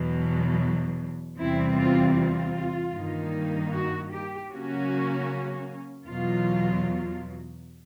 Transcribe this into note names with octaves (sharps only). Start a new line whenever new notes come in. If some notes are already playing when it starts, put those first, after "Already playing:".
Already playing: E2 B2 F#3
E2 C3 E3 G3 C4 E4
F4
F4
G2 D#3 G3 A#3 D#4
F#4
G4
C#3 F#3 A#3 C#4 F#4
E2 B2 F#3 F4